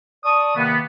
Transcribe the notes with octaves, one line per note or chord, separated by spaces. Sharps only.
D5 A5 C#6 D#6
C3 D#3 A#3 B3